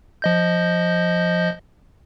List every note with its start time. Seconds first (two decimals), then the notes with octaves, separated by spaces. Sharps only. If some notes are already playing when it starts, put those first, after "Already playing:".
0.22 F3 D#5 G6